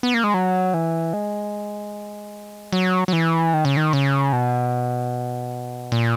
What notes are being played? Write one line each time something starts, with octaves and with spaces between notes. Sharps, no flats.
B3
A#3
G#3
F#3
E3
G#3
F#3
F#3
E3
D#3
C#3
D#3
C#3
B2
A#2